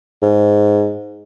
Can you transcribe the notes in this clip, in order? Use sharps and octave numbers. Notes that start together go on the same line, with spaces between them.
G#2